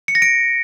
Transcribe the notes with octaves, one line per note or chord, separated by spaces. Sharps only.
C#7
A#6
D7